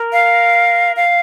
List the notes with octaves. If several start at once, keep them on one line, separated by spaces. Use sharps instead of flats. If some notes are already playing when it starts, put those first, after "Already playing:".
Already playing: A#4
F5
F5